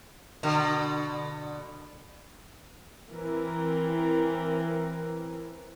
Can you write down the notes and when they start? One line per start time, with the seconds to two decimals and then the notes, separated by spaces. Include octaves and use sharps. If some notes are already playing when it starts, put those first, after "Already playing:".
0.43 B2 D3
3.12 E3 C4 A#4